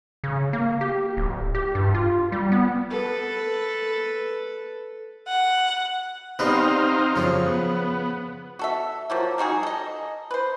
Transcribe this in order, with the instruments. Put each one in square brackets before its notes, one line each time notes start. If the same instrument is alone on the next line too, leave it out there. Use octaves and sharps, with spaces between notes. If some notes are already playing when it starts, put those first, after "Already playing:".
[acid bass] C#3
A#3
G4
D1
G4
G2
F4
G3
B3
[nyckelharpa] A4 B4
[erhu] F#5
[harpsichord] G3 B3 B4 [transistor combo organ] C4 D#4 F5
[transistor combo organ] F#2 [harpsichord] C#3 F3
[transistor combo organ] B3
[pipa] F#4 A4 E5
F3 F#3 A#3
G3 D#4 F#4 G#4
A4 D#5
B4 C5